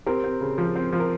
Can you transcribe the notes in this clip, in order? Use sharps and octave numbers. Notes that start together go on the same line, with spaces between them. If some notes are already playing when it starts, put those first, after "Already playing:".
C4 G4 A#4
C4
C#3
F3
C4
F3
A#4